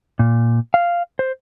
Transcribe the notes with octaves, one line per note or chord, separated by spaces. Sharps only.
A#2
F5
C5